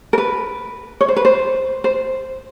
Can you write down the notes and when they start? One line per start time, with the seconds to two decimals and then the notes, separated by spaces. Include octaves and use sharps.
0.13 A#4
0.18 B4
1.01 C#5
1.08 C5
1.16 B4
1.25 C5
1.84 C5